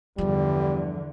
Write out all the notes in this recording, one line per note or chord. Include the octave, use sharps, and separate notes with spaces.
E2 G2 D3 F3 G3